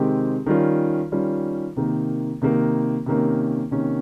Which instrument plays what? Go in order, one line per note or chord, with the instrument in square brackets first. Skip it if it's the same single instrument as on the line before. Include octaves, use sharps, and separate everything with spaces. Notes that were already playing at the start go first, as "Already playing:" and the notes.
Already playing: [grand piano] C3 D#3 G#3 C4 G4
D#3 G3 C#4 F4
D#3 G3 C#4 F4
C3 D#3 A#3
C3 D#3 A#3
C3 D#3 A#3 C#4
C3 D#3 A#3 C#4